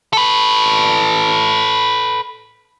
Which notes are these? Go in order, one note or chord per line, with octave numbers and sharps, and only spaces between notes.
A4 B4